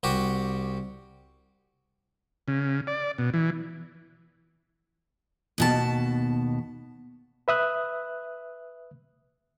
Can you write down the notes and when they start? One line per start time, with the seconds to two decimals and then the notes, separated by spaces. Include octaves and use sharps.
0.03 C2 F#4 G4
2.48 C#3
2.87 D5
3.18 B2
3.34 E3
5.58 D#2 B2 A5
7.48 B4 E5 D#6 F#6